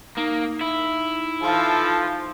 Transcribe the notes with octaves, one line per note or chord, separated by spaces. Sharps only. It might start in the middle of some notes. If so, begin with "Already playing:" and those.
A#3 D#4
E4
E3 F3 F4 A4